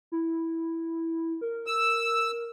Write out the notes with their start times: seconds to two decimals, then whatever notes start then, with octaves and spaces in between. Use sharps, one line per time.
0.12 E4
1.41 A#4
1.67 E6